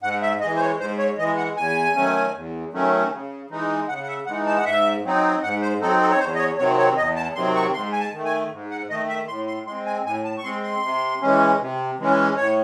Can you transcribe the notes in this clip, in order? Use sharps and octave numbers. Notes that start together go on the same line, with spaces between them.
G#2 F#5
E5
E3 G#3 D#5
C5
C#5
G#2 C5
C#5
E3 G#3 D#5
F#5
E2 G#5
D#3 F#3 A3 C#4
E2
D#3 F#3 A3 C#4
C#3
E3 G#3 D#4
C#3 F#5
F#5
E5
E3 G#3 D#4 F#5
A5
F#5
G#2 E5
F#3 C4 D#4
G#2 F#5
C5
F#3 C4 D#4 A4
A4
C#5
E2 C5
D#5
C#5
C3 D#3 F#3 C4 C#5
C#5
E2 D#5
A5
C3 D#3 F#3 C4 C6
C#6
G#2 C6
G#5
A5
D#3 A3
G#5
G#2
F#5
D#3 A3 D#5
E5
A2 C6
C6
G#3 C4 C6
G#5
A2 G#5
A5
C#6
G#3 C4 C6
C6
C3
E3 G#3 C#4
C3
E3 G#3 C#4
A2 C#5